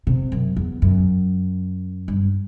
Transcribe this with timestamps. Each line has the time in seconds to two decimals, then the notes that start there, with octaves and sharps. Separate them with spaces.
0.07 C3
0.32 F#2
0.56 E2
0.82 F#2
2.08 G2